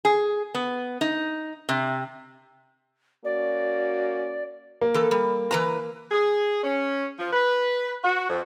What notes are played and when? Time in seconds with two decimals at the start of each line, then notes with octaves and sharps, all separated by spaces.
0.05 G#4
0.54 B3
1.01 D#4
1.69 C3
3.24 A#3 C#4 F#4 D5
4.81 A#3
4.94 E3 A4
5.11 G3
5.51 E3 B4 A#5
6.11 G#4
6.63 C#4
7.18 F3
7.33 B4
8.04 F#4
8.29 F2